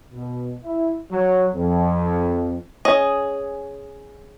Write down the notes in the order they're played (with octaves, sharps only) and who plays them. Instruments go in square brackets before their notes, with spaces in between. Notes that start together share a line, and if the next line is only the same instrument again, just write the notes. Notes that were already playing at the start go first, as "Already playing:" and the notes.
[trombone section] B2
E4
F#3
F2
[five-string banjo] C#4 G#4 D#5